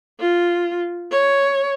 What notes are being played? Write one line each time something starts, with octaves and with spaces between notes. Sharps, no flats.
F4
C#5